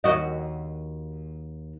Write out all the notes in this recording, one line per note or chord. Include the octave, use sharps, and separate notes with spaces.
D#2 F#4 D#5